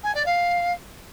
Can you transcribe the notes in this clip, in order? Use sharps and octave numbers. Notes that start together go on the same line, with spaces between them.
G#5
D5
F5